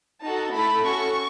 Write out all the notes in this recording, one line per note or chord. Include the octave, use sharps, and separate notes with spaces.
D#4 F#4 A4 A5
A3 E4 A4 B5
C#4 F#4 A4 C#6